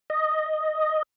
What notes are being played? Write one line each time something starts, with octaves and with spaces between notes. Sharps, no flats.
D#5